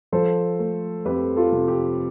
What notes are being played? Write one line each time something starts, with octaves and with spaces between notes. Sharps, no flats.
F3 A4 C5
A3
F2 G4 B4
F4 A4
C3
G4